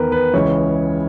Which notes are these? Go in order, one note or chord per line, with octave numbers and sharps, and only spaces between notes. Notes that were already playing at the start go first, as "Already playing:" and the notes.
Already playing: E2 D#3 A#4 B4
B4
C#2 C#3 E3 C#5